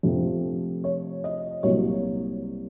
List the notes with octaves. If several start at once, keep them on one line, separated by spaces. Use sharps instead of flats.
F2 C3 F3 A3
C#5
D#5
C2 C3 F#3 A#3 C#5